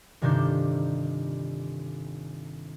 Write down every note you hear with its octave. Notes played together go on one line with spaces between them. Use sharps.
G1 C3 D#3 D4 G6